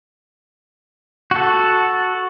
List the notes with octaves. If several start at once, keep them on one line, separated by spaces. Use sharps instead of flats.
F#4 A4